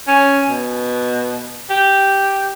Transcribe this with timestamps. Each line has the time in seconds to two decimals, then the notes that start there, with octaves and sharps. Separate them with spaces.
0.07 C#4
0.49 B2
1.70 G4